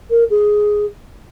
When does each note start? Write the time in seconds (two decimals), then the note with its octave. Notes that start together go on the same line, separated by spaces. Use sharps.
0.10 A#4
0.30 G#4